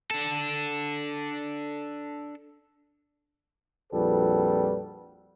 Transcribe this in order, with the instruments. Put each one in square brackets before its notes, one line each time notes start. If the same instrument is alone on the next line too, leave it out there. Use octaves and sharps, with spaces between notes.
[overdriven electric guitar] D4 A4
[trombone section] A#1 F2 G3 F#4 A4 B4